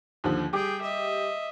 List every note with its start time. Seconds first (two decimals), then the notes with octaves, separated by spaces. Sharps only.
0.24 D#2 D3 F3
0.53 G3 G4 G#4 G5 D6
0.81 D#5 E5